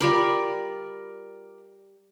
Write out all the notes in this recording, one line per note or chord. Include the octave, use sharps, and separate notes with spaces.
G3 F4 A#4 D5 B5